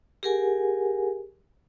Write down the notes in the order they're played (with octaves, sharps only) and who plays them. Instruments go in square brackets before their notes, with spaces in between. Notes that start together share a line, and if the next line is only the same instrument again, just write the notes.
[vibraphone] G4 G#4 A#4 F#5 G#5